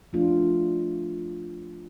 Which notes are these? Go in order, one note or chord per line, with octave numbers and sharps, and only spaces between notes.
F3 A3 D4 F4